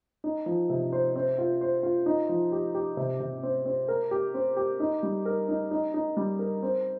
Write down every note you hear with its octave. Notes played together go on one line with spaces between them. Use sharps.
D#4
F3
C3
C5
C4
F4
C5
F4
D#4
F3
G4
G4
C3
C3
C4
C4
A#4
G4
C4
G4
D#4
G3
A#4
D#4
D#4
D#4
G3
A#4
C4